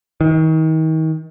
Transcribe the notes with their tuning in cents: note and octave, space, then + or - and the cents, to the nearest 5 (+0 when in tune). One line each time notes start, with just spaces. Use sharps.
D#3 +35